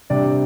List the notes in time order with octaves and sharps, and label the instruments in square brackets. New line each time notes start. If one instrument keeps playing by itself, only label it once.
[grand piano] C3 G3 D4 D5